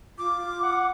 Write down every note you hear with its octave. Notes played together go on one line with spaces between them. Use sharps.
F4 D6
F#5